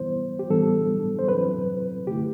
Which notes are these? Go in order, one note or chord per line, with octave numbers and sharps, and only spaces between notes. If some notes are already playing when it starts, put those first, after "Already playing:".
Already playing: E3 G3 B3 E4 C5
G4
A2 E3 G3 B3 D4 A4
C5
F#3 C4 E4 B4
D3 A3 E4 G4